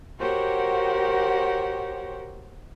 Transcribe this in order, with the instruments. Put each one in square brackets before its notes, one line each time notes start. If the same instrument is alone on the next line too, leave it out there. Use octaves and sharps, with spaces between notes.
[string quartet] F#4 G4 A#4 C5 C#5 F#5